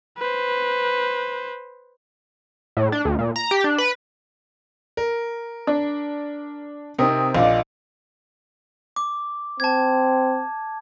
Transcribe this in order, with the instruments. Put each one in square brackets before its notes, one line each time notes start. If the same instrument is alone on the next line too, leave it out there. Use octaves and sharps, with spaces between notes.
[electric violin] B4 C5
[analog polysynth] A2
D4
D2
A#2
A#5
G4
D4
B4
[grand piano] A#4
[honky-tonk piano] D4
[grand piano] C3 A#4 [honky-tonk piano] C4 D#4 [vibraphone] G5 D#6
[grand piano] A#1 A#2 D4 [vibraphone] D#5 F5
[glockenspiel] D6
[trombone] C4 [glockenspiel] A5 G#6